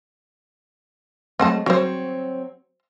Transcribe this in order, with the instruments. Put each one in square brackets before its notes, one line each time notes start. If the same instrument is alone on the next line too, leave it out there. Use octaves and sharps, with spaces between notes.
[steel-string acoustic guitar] F#3 G#3 A3 [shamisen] C4 F#5 A5
[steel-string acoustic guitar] F#3 C4 C#5 [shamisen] F#4 C5